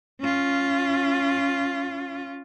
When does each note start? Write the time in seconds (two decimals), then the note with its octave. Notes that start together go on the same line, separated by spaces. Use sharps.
0.20 C#4 F4